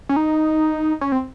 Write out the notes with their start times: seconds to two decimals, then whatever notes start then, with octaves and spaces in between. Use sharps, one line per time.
0.09 C#4
0.16 D#4
1.01 C#4
1.12 C4